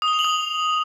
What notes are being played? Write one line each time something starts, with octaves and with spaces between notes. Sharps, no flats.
D#6
G7
F7
F#7
D#6